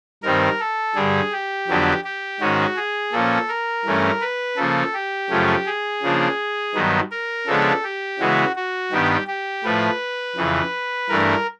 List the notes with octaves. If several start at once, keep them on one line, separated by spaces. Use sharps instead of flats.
G2 D#3 G3 C4 A#4
A4
G2 D3 G3 G#4
G4
F2 D3 F#3 B3 D4
G4
G#2 D#3 G#3 C#4 F#4
G#4
A#2 F3 A#3 C#4 A4
A#4
G2 E3 A3 C#4
B4
C#3 F3 A#3 A4
G4
F#2 C#3 F3 A3 C#4
G#4
C#3 F3 A#3 D4
G2 D#3 F#3 B3
A#4
C#3 F3 G#3 B3 D4 A4
G4
C#3 E3 G#3 B3 F#4
F#4
G2 D#3 G3 B3 D4 G4
G4
A2 F3 A3 B4
F2 C#3 E3
G2 E3 A3 D4 A#4